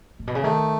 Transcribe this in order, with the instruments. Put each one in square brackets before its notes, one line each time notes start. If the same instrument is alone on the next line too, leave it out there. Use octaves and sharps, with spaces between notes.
[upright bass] A2
B2
C#3
[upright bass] D#3 [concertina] A3